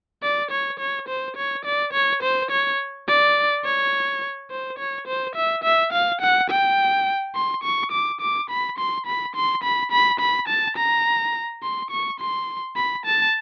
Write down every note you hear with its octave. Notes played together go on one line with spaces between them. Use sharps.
D5
C#5
C#5
C5
C#5
D5
C#5
C5
C#5
D5
C#5
C5
C#5
C5
E5
E5
F5
F#5
G5
C6
C#6
D6
D6
B5
C6
B5
C6
B5
B5
B5
A5
A#5
C6
C#6
C6
B5
A5